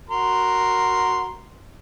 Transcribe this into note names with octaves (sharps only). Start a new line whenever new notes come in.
F#4 A#4 C6